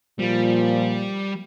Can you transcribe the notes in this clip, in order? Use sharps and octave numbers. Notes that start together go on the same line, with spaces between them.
A#2 F3 G3